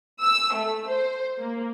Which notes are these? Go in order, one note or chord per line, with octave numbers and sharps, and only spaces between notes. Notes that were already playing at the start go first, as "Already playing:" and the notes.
E6
A3
C5
A#3